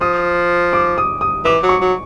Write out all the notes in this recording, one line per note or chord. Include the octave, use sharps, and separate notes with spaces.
F3 D#6
D6
D#6
D#6
E3 D6
F#3
C#6
F#3